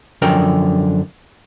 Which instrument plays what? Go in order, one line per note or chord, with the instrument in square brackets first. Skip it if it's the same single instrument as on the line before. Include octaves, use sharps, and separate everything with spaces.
[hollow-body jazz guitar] F#2 D3 F3 A#4 G5